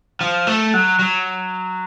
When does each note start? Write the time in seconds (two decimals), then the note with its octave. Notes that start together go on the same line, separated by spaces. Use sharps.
0.21 F3
0.47 A3
0.74 F#3
0.99 F#3